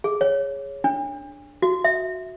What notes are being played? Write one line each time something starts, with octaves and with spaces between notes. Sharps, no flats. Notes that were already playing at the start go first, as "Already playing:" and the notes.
G#4
C#5
D4
F#4
E5